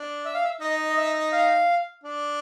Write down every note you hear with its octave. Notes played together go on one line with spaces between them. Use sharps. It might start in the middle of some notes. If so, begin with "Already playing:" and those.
Already playing: D4
E5
F5
E5
D#4 D#5
D#5
E5
F5
D4